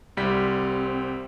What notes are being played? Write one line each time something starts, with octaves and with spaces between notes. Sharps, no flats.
C2 G3 C4 B6